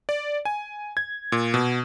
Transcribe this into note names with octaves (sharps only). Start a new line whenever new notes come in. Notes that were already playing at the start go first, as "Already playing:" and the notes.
D5
G#5
G#6
A#2
B2